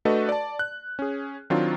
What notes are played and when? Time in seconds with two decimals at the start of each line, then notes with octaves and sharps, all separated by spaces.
0.05 A3 D4 F#4 A4 B4 D#5
0.29 D5 A5
0.59 F#6
0.99 C#4 G#4
1.50 D#3 F#3 C4 D4 F4